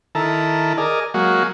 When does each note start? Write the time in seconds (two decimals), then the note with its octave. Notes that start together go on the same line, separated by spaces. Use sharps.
0.15 D#3 E4 A4 A5 A#5
0.78 G#4 A#4 D5 D#5
1.14 F#3 G#3 A#3 F#4